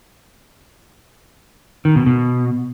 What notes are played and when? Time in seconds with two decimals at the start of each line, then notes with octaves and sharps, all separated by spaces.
1.85 D#3
1.96 B2
2.06 B2